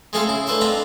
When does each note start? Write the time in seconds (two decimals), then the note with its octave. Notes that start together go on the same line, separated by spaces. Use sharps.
0.13 G#3 A3 C4 G#4 A4 F5
0.27 C#3 E4
0.47 A3 D4 B4 C5 E5
0.61 F2 C4 D4 F4 A#5 B5